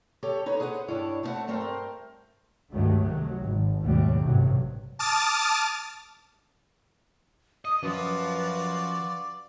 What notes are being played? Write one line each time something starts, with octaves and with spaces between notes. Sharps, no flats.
G4 A4 C#5
D#4 B4 C#5
G#4 B4 C5 F5 F#5
G2 D4 E4 C#5
A3 C4 F4 C5 E5 F#5
G2 A3 C4 A#4 C5
C#2 G2 D#3 F#3 A3
C3 D#3 F#3
G#1
D#2 G#2 B2 F#3 G3 A3
A1 G2 C3 F#3
A5 D6 D#6 F6 A6
D#5 D#6
F#2 F3 F4 F#4 B4 D5